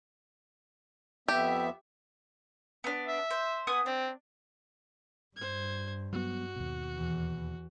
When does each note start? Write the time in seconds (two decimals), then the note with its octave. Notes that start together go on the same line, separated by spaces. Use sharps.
1.28 F2 B3 G4 E5
2.84 B3 D4
3.06 E5
3.30 C5
3.67 B3 G#5 D#6
3.86 C4 D4
5.37 G2 C5 G#6
6.13 F#3 G3 B3 F#4
6.56 D#2 B2
6.93 E2 E3